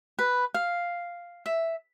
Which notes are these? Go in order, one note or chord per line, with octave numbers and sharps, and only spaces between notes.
B4
F5
E5